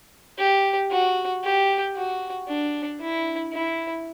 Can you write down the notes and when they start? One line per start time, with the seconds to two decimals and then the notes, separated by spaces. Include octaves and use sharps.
0.39 G4
0.91 F#4
1.44 G4
1.95 F#4
2.48 D4
3.01 E4
3.52 E4